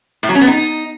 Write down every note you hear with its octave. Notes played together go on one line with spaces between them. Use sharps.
A2
F#3
C#4
B3
D#4